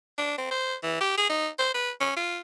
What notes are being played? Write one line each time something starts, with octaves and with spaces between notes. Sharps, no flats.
D4
C4
C5
E3
G4
G#4
D#4
C5
B4
C#4
F4